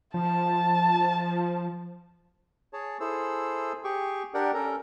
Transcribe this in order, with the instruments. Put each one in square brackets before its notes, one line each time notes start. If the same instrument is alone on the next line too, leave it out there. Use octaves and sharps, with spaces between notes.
[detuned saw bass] F3 [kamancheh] A5
[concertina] G#4 C#5 A5
E4 G#4 A4 C5 E6
G4 G#4 G5 C#6
D4 G4 A#4 D5 F#5 G5
C#4 A4 A#4 A#5